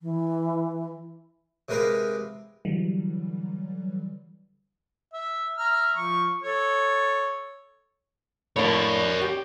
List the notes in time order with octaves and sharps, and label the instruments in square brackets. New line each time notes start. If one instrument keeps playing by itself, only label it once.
[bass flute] E3
[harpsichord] C3 G#3 A#4 B4 F5
[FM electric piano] D3 E3 F#3 G3
[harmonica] E5
E5 A#5 F6
F3 C#6
A4 C#5
[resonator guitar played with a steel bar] A2 A#3 D4 [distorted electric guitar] A#4 C#5
[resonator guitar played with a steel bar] G4